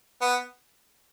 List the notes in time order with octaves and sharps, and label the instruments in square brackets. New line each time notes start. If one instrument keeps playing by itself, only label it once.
[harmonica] B3